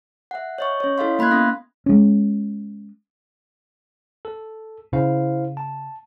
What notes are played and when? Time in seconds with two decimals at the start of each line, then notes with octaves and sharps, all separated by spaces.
0.31 E5 F#5
0.58 C#5 D#5 C#6
0.80 C#4 C#5
0.98 E4 A4 D#5 F5 C6
1.19 A#3 B5 C6 F#6 G#6
1.31 B3 C#4 F5 D#6 A#6
1.86 G#3 C#4
4.25 A4
4.93 C#3 E4 C5 F5
5.57 A5